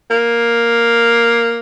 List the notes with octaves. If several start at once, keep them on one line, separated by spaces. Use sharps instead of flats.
A#3